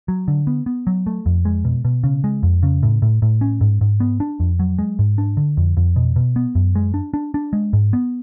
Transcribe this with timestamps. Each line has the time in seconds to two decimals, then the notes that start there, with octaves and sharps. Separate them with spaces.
0.08 F#3
0.28 D3
0.47 B3
0.66 B3
0.87 F#3
1.07 A3
1.26 F2
1.45 G#3
1.65 B2
1.85 B2
2.04 C#3
2.24 G#3
2.43 F2
2.63 C#3
2.83 A2
3.02 A2
3.22 A2
3.41 C#4
3.61 G#2
3.81 G#2
4.00 B3
4.20 D4
4.40 F2
4.59 F#3
4.79 G#3
4.99 G#2
5.18 D4
5.37 D3
5.57 F2
5.77 F2
5.96 B2
6.16 B2
6.36 B3
6.55 F#2
6.75 G#3
6.94 D4
7.14 D4
7.34 D4
7.53 G#3
7.73 G#2
7.93 B3